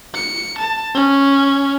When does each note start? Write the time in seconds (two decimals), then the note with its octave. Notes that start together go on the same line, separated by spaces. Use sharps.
0.14 C#7
0.58 A5
0.94 C#4